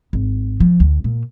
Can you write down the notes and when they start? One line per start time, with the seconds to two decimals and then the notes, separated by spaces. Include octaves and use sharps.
0.13 G#1
0.60 F3
0.80 D2
1.04 A#2